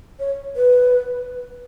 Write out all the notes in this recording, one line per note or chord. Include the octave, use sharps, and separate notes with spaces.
C#5
B4